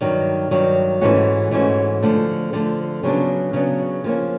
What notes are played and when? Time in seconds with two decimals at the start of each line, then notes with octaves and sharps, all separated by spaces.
0.01 G2 D#3 F#3
0.51 G2 D#3 F#3
1.01 G#2 E3 A3 C#4 F#4
1.51 G#2 E3 A3 C#4 F#4
2.03 D3 F3 A3
2.53 D3 F3 A3
3.03 C#3 F#3 B3 D4
3.53 C#3 F#3 B3 D4
4.04 F3 A#3 C#4